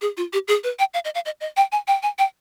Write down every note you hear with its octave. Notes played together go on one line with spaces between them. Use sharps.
G#4
F4
G4
G#4
B4
G5
F5
D#5
F5
D#5
D#5
G5
G#5
G5
G#5
G5